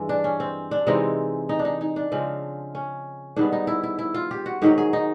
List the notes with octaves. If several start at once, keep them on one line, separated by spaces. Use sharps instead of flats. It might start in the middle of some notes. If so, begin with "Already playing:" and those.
Already playing: G2 E3 G#3
D4
C#4
C4
D4
C3 E3 G#3 C4 D#4
D#4
D4
D#4
D#4
D4
C#3 F3 G#3 C4
C#4
G#2 D#3 G3 B3 D4
D#4
E4
E4
E4
F4
G4
F#4
G#2 D#3 F#3 G4
G#4
D#4